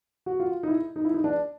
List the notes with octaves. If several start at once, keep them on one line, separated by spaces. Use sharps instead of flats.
F#4
F4
D#4
E4
D#4
E4
D#4
D4